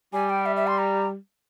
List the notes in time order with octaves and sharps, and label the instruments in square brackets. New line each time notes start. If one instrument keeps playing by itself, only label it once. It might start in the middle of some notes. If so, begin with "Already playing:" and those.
[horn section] G3 [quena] G#5
[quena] G5
E5
E5
C6
A#5